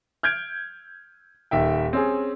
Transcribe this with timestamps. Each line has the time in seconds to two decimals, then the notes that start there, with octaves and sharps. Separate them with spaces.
0.23 F6 G6 G#6 D7
1.51 D#1 D#3 E5 G5
1.93 C4 C#4 G#4